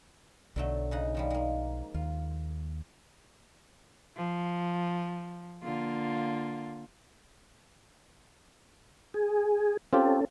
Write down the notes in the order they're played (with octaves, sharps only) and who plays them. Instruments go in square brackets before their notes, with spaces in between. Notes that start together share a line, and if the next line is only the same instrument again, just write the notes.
[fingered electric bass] B1 [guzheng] D3 F#3 A3
[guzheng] C#3 D#4 F#5
D#3 F3 G3
G#3 A#3
[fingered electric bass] D#2 [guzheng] F4
[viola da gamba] F3
D3 A#3 F4
[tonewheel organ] G#4
[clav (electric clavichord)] C4 F4 G4 [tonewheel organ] C#4 A4